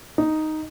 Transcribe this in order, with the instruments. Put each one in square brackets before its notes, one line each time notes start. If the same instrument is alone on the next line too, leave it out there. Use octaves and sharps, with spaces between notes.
[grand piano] D#4